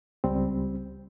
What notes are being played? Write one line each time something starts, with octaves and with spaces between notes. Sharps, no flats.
C#2 G3 C4